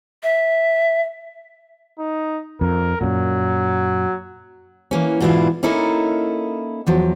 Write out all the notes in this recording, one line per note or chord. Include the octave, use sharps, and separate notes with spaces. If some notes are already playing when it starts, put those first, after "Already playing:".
E5
D#4
F2 A#4
F#2 A#2 F#3
E3 A#3 C#4
G#2 B2 E3 D4 E4 F4
A#3 C#4 D#4 E4 A4 A#4
E2 F3 F#3